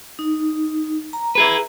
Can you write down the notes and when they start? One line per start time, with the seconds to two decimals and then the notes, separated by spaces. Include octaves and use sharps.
0.19 D#4
1.13 A#5
1.35 E4 G#4 B4